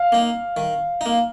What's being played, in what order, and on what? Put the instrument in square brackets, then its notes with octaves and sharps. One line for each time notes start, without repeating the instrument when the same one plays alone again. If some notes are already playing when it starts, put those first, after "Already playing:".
Already playing: [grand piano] F5
[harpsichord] A#3 D#4
D#3
A#3 D#4